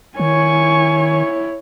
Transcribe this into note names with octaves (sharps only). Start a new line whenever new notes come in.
D#3 E4 C#5 G#5 C#6